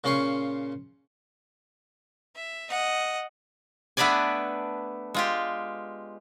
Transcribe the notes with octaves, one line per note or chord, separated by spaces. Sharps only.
A#2 C#3 C#4 F5 C6 C#6
E5
D#5 F#5
A3 B3 D4 B4 D5 G#5
G#3 F4 G4